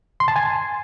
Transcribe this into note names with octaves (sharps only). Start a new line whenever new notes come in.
C6
A5
G#5